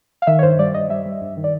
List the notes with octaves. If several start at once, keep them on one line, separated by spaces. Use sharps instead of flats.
F5
D#3 E5
C#5
G2 C5
G3 D5
G2 D#5
G3 E5
G3
G2
D#3
D5